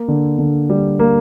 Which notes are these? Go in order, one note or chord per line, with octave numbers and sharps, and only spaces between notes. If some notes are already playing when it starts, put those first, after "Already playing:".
Already playing: A#3
D3
D3
G3
A#3